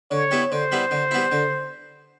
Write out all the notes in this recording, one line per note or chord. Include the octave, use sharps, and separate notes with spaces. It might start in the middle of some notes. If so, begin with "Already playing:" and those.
D3 C#5
G3 B3 E4
D3 C5
G3 B3 E4
D3
G3 B3 E4
D3